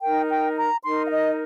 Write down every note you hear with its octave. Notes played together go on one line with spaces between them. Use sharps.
D#4 A#4 G5
G5
A#5
D#4 A#4 C6
F5
D#5